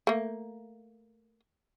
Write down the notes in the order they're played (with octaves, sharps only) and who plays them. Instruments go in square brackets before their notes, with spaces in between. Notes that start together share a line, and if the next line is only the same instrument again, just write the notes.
[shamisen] A3 A#3